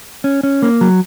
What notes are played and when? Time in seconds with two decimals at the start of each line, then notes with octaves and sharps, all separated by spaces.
0.24 C#4
0.43 C#4
0.62 A#3
0.81 F#3